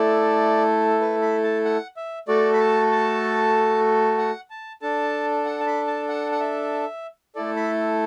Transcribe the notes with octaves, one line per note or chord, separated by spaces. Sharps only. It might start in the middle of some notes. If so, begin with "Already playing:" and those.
Already playing: A3 E4 A4 D5
B4
B5
A5
F#5
E5
A3 F#4 A4 D5
B5
A5
A5
F#5
A5
D4 A4 A5
F#5
A5
B5
A5
F#5
F#5
E5
A3 E4 A4 D5
B5